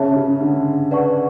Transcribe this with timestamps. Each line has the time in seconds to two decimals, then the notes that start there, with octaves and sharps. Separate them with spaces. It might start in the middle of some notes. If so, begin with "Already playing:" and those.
Already playing: C#3 G#4 C#5 E5 A5
0.16 C#3
0.40 D3
0.91 B4 D5 F#5 A5 C#6